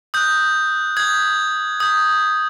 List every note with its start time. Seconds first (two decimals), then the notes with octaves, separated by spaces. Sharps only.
0.14 D#6 F#6 G6
0.97 D#6 G6 G#6
1.80 D#6 G6